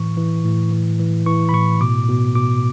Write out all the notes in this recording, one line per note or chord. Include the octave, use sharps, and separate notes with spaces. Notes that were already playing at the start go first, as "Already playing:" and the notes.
Already playing: A2 E3 C#6
E3
A2
E3
E3
E3 C#6
B5
A2 C#6
B2 D6
B2
B2 D6